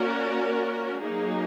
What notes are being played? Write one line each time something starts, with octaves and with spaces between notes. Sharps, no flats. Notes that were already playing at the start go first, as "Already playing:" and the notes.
Already playing: A#3 C#4 F#4 A#4 D5
F#3 A#3 D#4 G#4